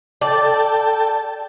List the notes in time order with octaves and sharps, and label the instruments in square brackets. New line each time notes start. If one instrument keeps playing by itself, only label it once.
[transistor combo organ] A4 G5 A5 [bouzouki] D5